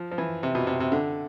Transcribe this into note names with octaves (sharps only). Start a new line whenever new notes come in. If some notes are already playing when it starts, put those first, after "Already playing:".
Already playing: F3
F3
E3
C3
B2
C3
C3
D3